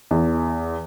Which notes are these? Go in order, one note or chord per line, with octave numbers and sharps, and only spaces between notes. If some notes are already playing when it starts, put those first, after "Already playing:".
E2